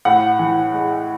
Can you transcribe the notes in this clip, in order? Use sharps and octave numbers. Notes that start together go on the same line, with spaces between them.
A2 F#5
E3
G#3